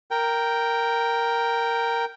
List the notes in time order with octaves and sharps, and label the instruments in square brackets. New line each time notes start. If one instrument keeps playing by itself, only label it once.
[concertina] A#4 G5